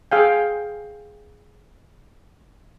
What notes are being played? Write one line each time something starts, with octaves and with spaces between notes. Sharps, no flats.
G#4 F5 G5